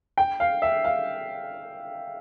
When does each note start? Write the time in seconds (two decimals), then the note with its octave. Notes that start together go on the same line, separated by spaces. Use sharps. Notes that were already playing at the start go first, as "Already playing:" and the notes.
0.18 G5
0.40 F5
0.62 E5
0.84 F5